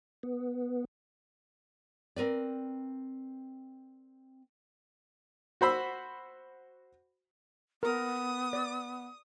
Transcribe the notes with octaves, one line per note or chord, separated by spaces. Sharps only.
B3
C4 A#4 B4 D5
F#4 C5 B5 E6
B3 A#4 D#6
D5